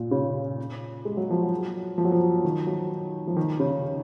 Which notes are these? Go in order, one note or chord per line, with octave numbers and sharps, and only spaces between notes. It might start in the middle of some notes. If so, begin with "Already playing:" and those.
Already playing: A#2
C#3
G#3
F#3
F3
F#3
F3
F#3
F3
D#3
F#3
F3
D#3
C#3